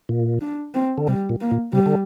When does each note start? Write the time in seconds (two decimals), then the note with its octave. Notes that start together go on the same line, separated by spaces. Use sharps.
0.09 A#2
0.41 D4
0.74 C4
0.98 D3
1.07 C3 G3
1.29 A#2
1.41 A#3
1.51 A#2
1.73 C3 G3
1.86 D3